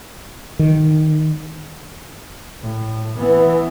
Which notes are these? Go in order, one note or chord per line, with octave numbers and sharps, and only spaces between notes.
D#3
A2
E3 B3